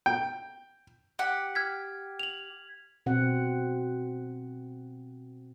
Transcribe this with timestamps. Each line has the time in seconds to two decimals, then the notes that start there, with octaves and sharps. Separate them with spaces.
0.06 G5
1.19 G4 F#5
1.55 F6 G#6 B6
2.19 F7 F#7
3.06 B2 C4 F#5